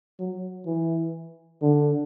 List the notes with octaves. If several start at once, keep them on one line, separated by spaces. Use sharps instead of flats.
F#3
E3
D3